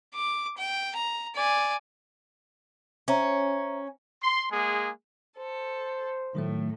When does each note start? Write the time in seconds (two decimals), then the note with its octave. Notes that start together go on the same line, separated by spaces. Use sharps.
0.15 D6
0.57 G5
0.96 A#5
1.36 D5 G#5
3.08 C#4 C5 E5 A#5
4.22 C6
4.52 G#3 A#3 G#4
5.38 A4 C5
6.35 A2 D#3 F#3 A3